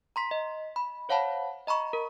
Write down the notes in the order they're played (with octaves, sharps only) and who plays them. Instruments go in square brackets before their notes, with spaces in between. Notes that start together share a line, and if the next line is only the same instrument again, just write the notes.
[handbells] A#5 C6 B6
D#5
B5
C5 C#5 F5 F#5 A5 B5
D#5 A#5 B5 C#6
A#4